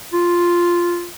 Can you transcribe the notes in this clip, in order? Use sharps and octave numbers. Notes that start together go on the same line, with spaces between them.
F4